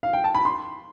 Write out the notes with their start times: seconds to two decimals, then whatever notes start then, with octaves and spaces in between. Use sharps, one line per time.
0.03 F5
0.13 G5
0.24 A5
0.35 B5
0.45 C6